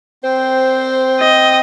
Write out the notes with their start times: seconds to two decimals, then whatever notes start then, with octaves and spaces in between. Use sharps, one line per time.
0.24 C4 C5 G5
1.19 D#5